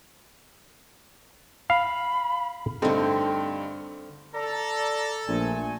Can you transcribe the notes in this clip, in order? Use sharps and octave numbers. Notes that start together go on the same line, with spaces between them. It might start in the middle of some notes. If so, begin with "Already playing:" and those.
F5 B5
G2 D3 A3 C4 D#4
A4 D5 A#5
A#1 A#2 A3 G#5